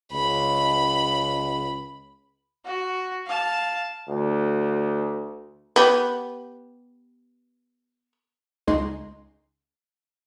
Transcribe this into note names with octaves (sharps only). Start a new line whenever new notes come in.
C#2 B5
F#4
F5 A5
D2
B3 G4
C#2 G#3 D#4 C6